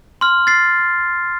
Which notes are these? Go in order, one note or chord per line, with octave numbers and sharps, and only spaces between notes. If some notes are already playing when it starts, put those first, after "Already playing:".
C6 F6
A6 C7